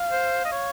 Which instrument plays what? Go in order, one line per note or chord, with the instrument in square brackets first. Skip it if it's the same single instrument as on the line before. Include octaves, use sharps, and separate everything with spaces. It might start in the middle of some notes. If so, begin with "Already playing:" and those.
Already playing: [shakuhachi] F5
[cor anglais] C5
D#5
C#5